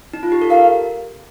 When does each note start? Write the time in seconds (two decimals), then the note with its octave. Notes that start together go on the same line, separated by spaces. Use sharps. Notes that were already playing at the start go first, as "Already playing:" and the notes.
0.13 D#4
0.23 F4
0.32 G4
0.42 A4
0.50 A#4 F5